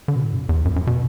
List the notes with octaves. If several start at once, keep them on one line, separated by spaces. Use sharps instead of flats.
D3
B2
A2
F#2
E2
F#2
F#2
B2